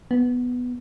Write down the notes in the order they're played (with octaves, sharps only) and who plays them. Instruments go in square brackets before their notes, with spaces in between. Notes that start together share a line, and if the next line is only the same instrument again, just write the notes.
[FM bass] B3